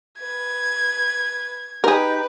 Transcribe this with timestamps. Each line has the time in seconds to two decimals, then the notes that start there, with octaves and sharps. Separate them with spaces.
0.20 B4 G#6
1.84 D#4 G4 G#4 A#4 B4 G6